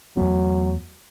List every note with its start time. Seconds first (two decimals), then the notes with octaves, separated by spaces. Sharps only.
0.17 E2 F#3 A3 B3